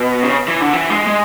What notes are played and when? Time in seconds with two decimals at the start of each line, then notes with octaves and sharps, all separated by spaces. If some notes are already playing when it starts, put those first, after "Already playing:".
Already playing: B2
0.23 C#3
0.48 E3
0.61 D3
0.74 E3
0.90 G#3
1.07 G#3